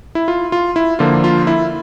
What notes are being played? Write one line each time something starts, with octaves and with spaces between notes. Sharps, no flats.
E4
F4
F4
E4
D3 F3 A#3 F4
F4
E4